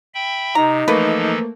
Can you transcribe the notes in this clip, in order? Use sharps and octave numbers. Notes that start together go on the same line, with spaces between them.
E5 G5 B5
C3 D#4 A#5
E3 F3 A3 A#3 A4 B4